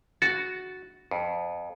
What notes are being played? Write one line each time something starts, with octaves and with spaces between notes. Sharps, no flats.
F#4 A6
F2